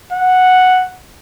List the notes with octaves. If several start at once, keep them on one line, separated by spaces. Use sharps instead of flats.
F#5